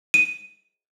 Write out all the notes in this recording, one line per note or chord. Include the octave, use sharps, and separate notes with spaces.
D#7